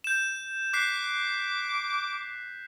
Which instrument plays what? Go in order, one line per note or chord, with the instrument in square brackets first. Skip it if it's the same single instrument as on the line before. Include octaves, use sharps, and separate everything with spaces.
[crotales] G6 E7
[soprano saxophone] D6 [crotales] F#6 B6 C7